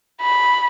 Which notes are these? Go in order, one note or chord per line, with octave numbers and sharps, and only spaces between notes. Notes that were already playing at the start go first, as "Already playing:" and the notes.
B5